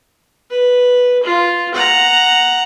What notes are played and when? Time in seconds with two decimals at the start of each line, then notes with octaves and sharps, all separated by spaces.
0.51 B4
1.24 F4
1.74 F#5 A#5